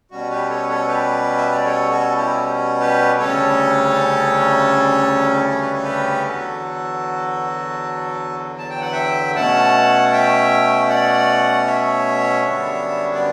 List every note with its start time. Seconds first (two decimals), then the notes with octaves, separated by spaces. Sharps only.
0.11 B2 G3 C#4 F#4
0.30 G4 B4
0.50 A4 C#5
0.62 B4
0.69 A4 C#5
0.88 G4 B4
1.38 E5
1.52 D5
1.65 A4 C#5
1.91 F#4 A4
2.16 E4 G4
2.80 G4 B4
3.19 D2 C#3 G3 C#4 A4 C#5
5.50 C#5
5.62 B4
5.72 A4
5.82 G4 B4
6.27 E2 D3 F#3 F#4 A4
8.59 A5
8.69 G5
8.81 F#5
8.92 E5 G5
9.36 B2 A3 C#4 F#5 A5
10.12 E5 G5
10.89 D5 F#5
11.66 C#5 E5
12.43 F#2 D3 G3 B3 D4
13.15 D5